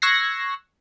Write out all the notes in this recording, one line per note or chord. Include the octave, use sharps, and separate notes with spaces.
C#6 E6 F#6 G#6 A#6 C7